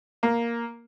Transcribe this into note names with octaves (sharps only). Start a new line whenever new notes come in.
A#3